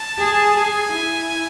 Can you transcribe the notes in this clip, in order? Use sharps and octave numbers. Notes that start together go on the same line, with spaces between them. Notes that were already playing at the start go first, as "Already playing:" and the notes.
Already playing: A5
G#4
G#4 G#5
E4